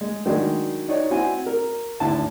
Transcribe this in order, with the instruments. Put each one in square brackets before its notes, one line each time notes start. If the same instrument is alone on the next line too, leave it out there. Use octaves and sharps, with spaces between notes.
[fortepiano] G#3
D#3 F#3 G#3 D4
D#4 C#5 D5
C4 E4 F#4 G#5
A#4
G#1 D2 E4 A5